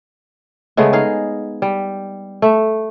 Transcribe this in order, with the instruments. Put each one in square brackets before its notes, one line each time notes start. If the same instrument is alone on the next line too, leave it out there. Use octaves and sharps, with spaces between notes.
[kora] C#3 G#3 A3 B3
D#4 G#4 F5
G3
A3